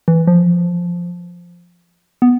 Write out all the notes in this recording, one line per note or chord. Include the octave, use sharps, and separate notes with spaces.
E3
F3
B3